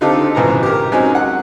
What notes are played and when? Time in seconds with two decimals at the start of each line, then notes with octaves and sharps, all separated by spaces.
0.01 D3 C4 D#4 F4 G4 A4
0.35 B1 G#2 E3 C#4 A#5
0.63 G4 A#4
0.92 F#3 G#3 C4 C#4 D#4
1.15 F#5